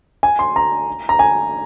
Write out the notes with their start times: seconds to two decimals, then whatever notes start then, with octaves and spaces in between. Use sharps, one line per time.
0.23 G#5
0.39 C6
0.56 A#5
1.09 A#5
1.19 G#5